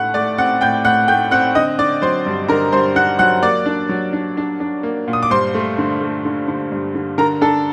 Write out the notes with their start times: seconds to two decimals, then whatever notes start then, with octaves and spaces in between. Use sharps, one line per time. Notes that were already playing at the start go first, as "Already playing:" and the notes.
Already playing: A2 A3 F#5 F#6
0.14 A3 D5 D6
0.38 C4 F#5 F#6
0.61 A2 G5 G6
0.85 A2 F#5 F#6
1.08 A3 G5 G6
1.31 C4 F#5 F#6
1.55 D3 D#5 D#6
1.79 D3 D5 D6
2.02 F#3 C5 C6
2.26 G2
2.48 D3 A#4 A#5
2.72 G2 C5 C6
2.96 D3 F#5 F#6
3.19 F#3 F#5 F#6
3.42 A#3 D5 D6
3.66 D4
3.89 F#3
4.13 D4
4.37 D4
4.60 D4
4.83 A#3
5.08 A#2
5.13 D#6
5.23 D6
5.31 G2 C5 C6
5.55 A3
5.78 D3
6.01 A3
6.25 D3
6.48 D3
6.72 G2
6.95 D3
7.18 D3 A#4 A#5
7.41 D4 A4 A5